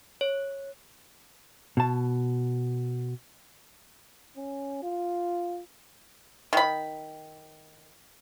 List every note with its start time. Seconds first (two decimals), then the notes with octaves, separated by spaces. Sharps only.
0.21 C#5
1.77 B2 A5
4.37 C#4
4.83 F4
6.53 D#3 B5